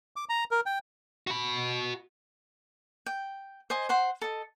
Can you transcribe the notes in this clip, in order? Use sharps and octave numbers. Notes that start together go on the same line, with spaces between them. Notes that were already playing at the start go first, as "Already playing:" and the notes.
D6
A#5
A#4
G5
F#4 B5
G5
C5 D#5 G#5
C5 F#5 C6
A4 D#5